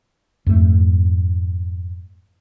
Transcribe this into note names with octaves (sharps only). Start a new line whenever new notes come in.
F2 G#2 A3